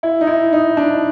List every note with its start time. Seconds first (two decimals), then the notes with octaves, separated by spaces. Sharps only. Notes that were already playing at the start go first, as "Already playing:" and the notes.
0.03 E4
0.21 D#4
0.27 E4
0.53 D#4
0.77 D4